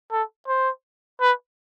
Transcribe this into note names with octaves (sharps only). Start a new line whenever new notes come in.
A4
C5
B4